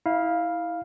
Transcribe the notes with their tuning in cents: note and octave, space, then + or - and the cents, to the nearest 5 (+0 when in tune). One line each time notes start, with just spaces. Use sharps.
E4 -25 F5 +0